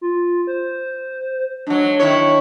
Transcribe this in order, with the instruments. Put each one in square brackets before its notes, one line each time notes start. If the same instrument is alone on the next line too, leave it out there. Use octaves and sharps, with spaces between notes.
[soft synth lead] F4
C5
[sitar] G#2 F#3 [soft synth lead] D4
[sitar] D#3 E4 C#5